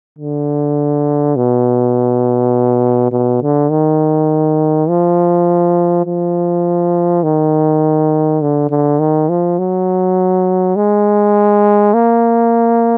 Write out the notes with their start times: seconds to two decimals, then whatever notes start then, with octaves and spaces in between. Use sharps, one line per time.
0.19 D3
1.36 B2
3.12 B2
3.42 D3
3.71 D#3
4.89 F3
6.06 F3
7.23 D#3
8.42 D3
8.70 D3
9.00 D#3
9.29 F3
9.59 F#3
10.76 G#3
11.94 A#3